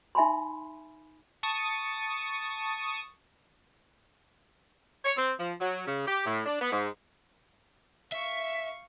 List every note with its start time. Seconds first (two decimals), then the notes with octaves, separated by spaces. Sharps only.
0.15 D#4 E5 G#5 B5 C6
1.43 A5 C#6 D#6
5.04 C#5
5.17 C4
5.39 F3
5.60 F#3
5.87 C#3
6.07 G4
6.26 A2
6.46 D4
6.60 B3
6.72 G#2
8.12 E5 F5 C#6